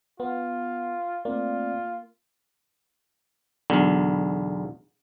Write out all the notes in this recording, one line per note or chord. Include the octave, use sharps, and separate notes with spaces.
B3 F4
A3 A#3 C4 F4 D5
B1 E2 D3